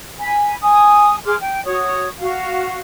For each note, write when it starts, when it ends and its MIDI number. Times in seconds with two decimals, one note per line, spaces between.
0.20 0.55 80
0.20 0.55 83
0.61 1.16 80
0.61 1.16 87
1.25 1.35 68
1.25 1.35 84
1.25 1.35 86
1.25 1.35 89
1.40 1.64 79
1.65 2.08 66
1.65 2.08 73
1.65 2.08 87
2.20 2.79 66
2.20 2.79 77